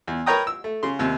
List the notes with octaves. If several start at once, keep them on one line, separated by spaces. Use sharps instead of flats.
E2
A#4 B4 C#5 G5 A#5 D#6
E6
A3
C#3 C6
D#2 C3